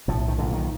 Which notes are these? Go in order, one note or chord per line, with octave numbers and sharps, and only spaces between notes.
B1 A2 F3
D#3
B1 A#2 D3
D#3